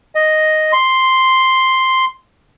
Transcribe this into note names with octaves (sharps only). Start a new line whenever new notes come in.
D#5
C6